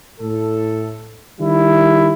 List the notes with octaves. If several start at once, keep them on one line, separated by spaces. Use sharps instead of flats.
A2 A4
D#3 G3 E4